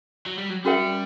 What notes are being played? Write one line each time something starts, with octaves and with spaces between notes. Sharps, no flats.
F#3
G3
F#3
G3 C#4 F#4 A#4 E5 G5